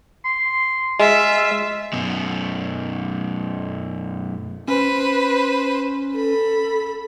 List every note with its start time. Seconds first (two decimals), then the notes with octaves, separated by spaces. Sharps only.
0.25 C6
1.00 G#3 F4 E5
1.93 F#2 B2
4.68 C#4 B4 C5
6.16 A4 B5